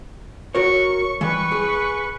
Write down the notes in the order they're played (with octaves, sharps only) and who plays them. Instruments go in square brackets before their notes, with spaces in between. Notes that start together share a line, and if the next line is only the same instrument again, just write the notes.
[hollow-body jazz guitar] F#4 A#4 C#5 [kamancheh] C#6
[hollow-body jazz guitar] E3 G3 [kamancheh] B4 C#6
[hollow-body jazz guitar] G#4